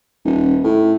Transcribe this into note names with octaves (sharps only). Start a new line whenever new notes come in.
D#1
A2